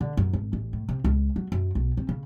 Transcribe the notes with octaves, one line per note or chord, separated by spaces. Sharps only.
D3
F#2
G#1
A1
A2
C3
C#2
F#3
F#2
B1
C4
C#3